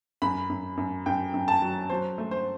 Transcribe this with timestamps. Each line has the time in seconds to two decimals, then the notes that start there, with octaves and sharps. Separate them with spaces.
0.22 F#2 B5
0.50 F#2
0.77 F#2
1.06 F#2 G5
1.34 F#2
1.48 A5
1.62 F#3
1.90 F#3 C5
2.18 A3
2.31 C5